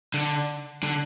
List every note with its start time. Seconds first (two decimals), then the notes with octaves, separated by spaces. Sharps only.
0.14 D3
0.83 D3